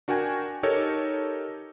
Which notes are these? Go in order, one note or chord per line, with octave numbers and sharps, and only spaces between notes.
D4 F#4 A#4 G5 G#5
D#4 G4 A4 A#4 C#5